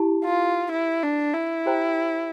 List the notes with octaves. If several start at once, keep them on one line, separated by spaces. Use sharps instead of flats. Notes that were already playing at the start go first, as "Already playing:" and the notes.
Already playing: E4 G4 A5
F4
E4
D4
E4
G4 C5 G5 A#5